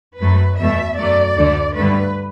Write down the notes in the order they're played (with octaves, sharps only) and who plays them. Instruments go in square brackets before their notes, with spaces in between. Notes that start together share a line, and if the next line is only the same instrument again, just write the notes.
[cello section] F#2 F#3 A3 B4
E2 B2 A3 E5
F#2 F#3 A3 D5
D2 D3 A3
G2 D3 A3 B4